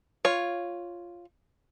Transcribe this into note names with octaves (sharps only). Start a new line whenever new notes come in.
F4 C#5